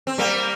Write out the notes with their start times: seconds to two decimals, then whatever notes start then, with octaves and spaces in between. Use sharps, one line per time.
0.07 C4
0.18 G3 A#3